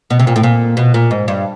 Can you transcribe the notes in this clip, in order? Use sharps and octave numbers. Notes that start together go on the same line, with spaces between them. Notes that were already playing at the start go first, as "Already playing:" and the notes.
B2
C3
A#2
A2
A#2
B2
A#2
G#2
G2